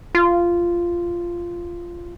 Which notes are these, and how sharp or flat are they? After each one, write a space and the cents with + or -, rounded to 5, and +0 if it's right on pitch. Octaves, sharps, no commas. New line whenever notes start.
F4 -10